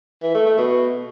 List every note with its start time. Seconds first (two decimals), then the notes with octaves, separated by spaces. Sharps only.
0.23 E3
0.34 A3
0.46 A3
0.58 B2